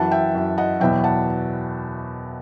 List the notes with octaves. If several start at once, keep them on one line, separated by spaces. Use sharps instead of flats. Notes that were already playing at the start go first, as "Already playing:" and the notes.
Already playing: F#2 E3 F#5 A5
E5 G5
F#2 E3
D#5 F#5
E2 B2 F#3 E5 G5
F#5 A5